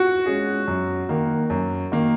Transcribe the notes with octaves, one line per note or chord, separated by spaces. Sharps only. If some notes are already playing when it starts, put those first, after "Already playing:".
Already playing: F#4
G#3 C#4 G#4
F#2
D#3 A#3
F#2
D#3 A#3